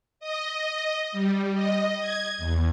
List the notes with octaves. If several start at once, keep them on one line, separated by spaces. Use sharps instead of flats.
D#5
G3
D#5
G#6
E2